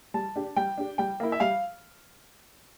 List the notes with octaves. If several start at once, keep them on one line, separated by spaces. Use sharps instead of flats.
G3 A5
D4 G4
G3 G5
D4 G4
G3 G5
A#3 E4
E5
G3 F5